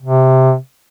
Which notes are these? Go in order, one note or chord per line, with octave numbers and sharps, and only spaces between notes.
C3